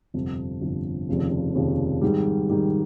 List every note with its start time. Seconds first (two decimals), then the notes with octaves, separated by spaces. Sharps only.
0.14 G1 F2 C3 F3
0.61 G1 F2 C3 F3
1.09 F1 D#2 C#3 F3
1.55 F1 D#2 C#3 F3
2.01 G#2 D#3 G3
2.49 G#2 D#3 G3